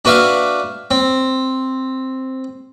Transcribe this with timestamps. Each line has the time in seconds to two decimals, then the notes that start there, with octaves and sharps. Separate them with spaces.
0.05 D4 F#4 B4 E5 F5
0.91 C4